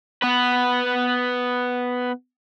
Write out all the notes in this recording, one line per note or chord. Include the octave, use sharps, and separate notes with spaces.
B3 B4